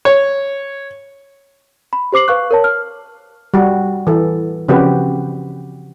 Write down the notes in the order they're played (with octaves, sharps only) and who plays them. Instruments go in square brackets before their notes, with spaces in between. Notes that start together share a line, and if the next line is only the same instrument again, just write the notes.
[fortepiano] C#5
[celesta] B5
G4 C5 D6 C7 F#7
B4 F5 C#6 F#6
A#4 C#5 A5
F6
[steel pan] G3 F#4
E3 A4
C#3 F3 C4 F#4 G4 B4